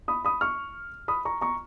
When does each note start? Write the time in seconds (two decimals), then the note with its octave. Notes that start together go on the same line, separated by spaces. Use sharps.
0.08 B5 D#6
0.25 B5 D#6
0.41 C#6 F6
1.08 B5 D#6
1.25 A#5 C#6
1.41 A#5 C#6